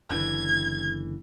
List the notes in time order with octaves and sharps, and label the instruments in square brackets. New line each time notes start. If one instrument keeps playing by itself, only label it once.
[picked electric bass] F#1 D3 E3 [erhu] G#6